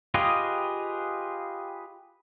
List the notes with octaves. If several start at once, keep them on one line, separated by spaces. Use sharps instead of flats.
F4 G4 G#4 B4 D#5